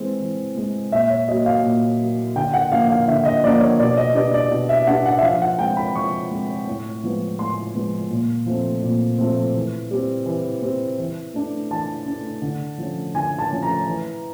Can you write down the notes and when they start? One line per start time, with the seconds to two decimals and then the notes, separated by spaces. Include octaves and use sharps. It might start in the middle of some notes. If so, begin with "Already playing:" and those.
Already playing: E3 G#3 C4
0.20 E3
0.55 G#3 C4
0.91 A#2 E5
1.10 C#5
1.28 F#3 A#3 D#5
1.46 F5
1.64 A#2
2.00 F#3 A#3
2.36 D3 G5
2.53 F#5
2.72 F3 A#3 D4 F5
2.89 F5
3.08 D3 E5
3.25 D#5
3.43 F3 A#3 D4 D5
3.61 C#5
3.79 B2 D5
3.97 D#5
4.15 G3 B3 D4 D5
4.34 D5
4.51 B2
4.69 E5
4.87 G3 B3 D4 F#5
5.06 F#5
5.18 E5
5.23 F3 F5
5.42 F#5
5.59 G#3 C4 G5
5.77 B5
5.95 F3 C#6
6.31 G#3 C4
6.67 A2
7.04 F3 G#3 B3
7.39 A2 C6
7.75 F3 G#3 B3
8.10 A#2
8.46 F3 A3 C4
8.82 A#2
9.18 F3 A3 C4
9.55 E3
9.91 G3 C4
10.26 E3
10.62 G3 C4
10.99 E3
11.34 A3 D4
11.71 E3 A5
12.06 A3 D4
12.42 D3
12.78 F3 A3 C#4
13.14 D3 G#5
13.38 A5
13.51 F3 A3 C#4
13.63 A#5
13.86 E3